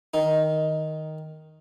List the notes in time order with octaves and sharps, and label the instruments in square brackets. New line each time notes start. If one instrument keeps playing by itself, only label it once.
[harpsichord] D#3 D#4